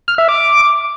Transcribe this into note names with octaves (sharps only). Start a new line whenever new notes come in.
F6
E5
D6